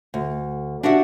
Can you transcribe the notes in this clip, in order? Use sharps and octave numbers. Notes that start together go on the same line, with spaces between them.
D2
D4 F#4 G4 E5 F#5